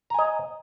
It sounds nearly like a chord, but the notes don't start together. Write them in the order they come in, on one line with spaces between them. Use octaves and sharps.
A#5 G#5 D#5